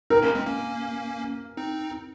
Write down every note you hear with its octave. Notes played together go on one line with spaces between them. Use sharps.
C4 D#4 A#4
A#3 C#4
G#3 C4
A#3 C#4
C4 D#4